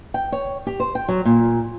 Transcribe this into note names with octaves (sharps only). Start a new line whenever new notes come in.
G5
C#5
G4
C5
G5
F#3
A#2